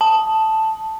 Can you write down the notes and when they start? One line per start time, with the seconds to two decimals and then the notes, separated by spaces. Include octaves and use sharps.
0.01 A5